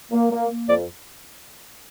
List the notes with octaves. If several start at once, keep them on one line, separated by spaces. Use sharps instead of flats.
A#3
A#3
A#3
F2 D5